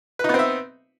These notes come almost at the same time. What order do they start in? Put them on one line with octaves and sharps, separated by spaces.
B4 D#4 B3 C4 E5